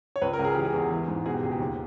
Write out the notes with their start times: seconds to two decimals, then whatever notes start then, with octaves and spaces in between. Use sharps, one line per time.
0.16 C#5
0.21 C#2 B4
0.33 A#4
0.39 C#2
0.45 G#4
0.55 E3 G4
0.65 G#4
0.73 E2
0.91 E3
1.08 G#2
1.25 B2 G#4
1.34 G4
1.43 C#2 G#4
1.51 G4
1.60 D#2